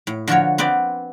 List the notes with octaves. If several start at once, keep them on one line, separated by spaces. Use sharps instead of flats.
A2
D3 F3 F#4 A#4 C#5
B3 C4 B4 D5